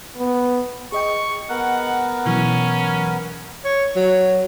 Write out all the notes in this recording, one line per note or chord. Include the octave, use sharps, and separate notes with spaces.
B3
G#4 D#5 G5 C#6
B3 A#4 F#5
B2 E3 F#3 C#4
C#5
F#3